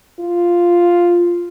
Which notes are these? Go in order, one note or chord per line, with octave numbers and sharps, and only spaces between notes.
F4